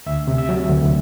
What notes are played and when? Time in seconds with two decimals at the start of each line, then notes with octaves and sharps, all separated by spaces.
0.06 D2 E5
0.27 C3
0.38 E5
0.49 F#3
0.69 D2